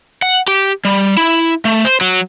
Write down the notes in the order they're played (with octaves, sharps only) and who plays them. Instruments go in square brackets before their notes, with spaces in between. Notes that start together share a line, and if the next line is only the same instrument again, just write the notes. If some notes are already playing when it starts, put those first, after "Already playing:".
[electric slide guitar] F#5
G4
G3
E4
A3
C5
F#3